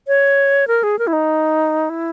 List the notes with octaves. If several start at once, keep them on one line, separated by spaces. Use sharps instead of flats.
C#5
A#4
G#4
A#4
E4
D#4
E4